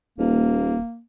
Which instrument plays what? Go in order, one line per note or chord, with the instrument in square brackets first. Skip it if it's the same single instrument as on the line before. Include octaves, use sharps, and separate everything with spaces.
[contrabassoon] D#1 [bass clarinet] A#3